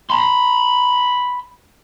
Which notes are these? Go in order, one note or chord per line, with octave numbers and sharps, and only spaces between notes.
B5 C6